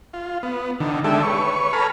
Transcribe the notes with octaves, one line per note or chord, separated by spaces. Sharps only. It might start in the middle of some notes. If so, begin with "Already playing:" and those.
F4
B3
D3 D#3
G#3 D4 G4 A4 E5
B4 C#5 C#6
A4 B4 G#5 A#5 B5 F6